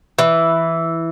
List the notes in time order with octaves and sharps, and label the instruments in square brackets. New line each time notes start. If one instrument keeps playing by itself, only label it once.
[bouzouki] E3